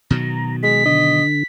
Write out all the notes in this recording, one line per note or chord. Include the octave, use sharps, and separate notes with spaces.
B2 D#3 F#3 A#5
G#3 B6
D3 D#5